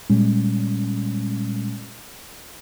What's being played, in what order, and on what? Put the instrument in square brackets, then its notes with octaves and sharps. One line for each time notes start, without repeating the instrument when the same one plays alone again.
[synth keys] A#2 G3 G#3 C#4